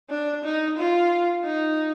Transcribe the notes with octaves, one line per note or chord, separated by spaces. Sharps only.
D4
D#4
F4
D#4